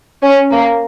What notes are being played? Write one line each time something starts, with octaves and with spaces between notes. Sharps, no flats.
C#4
A#3